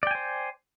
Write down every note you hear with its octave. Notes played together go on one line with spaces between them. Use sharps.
C5 D5 G5 G#5